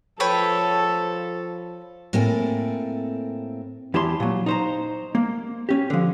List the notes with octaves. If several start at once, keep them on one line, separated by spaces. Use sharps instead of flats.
F3 A4 B4 C#5 G5
A2 A#3 C4 A4 G#5
E2 E4 G4 A5 C6
A#2 F#3
D#4 C5 A#5
A#3
C#4 G4
D3 F3